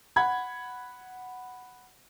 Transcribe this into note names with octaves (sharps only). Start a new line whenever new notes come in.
F#5 B5 G#6